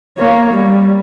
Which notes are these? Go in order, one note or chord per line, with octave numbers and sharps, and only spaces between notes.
A#3 C#5
G3